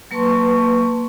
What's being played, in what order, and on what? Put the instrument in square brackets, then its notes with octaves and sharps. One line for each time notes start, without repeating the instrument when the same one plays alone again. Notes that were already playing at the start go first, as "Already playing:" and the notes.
[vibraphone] F#3 A#3 B4 A5 C6 C#6